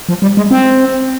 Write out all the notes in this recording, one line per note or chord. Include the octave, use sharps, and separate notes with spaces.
F3
G3
G#3
C4